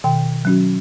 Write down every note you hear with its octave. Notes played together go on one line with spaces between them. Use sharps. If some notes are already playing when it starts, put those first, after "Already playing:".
B2 D#3 G5
F#3 C#4 F#4